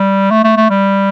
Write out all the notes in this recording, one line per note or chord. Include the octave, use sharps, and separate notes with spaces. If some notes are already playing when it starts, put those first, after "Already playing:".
Already playing: G3
A3
A3
A3
G3